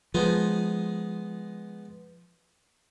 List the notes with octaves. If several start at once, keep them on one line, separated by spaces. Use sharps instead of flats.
F3 G#3 B3 D#4